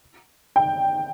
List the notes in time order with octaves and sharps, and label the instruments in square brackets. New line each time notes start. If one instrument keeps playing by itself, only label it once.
[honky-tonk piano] G5